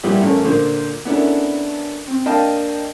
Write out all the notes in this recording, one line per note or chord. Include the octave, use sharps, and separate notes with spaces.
A#2 G3 B3 E4 F4 G#4
A1 A3 C#4 A#4
A#2 D3 A#3 C5
B3 C#4 D4 E4 A4 A#4
C4
A#3 D4 D#5 F5 G5 A5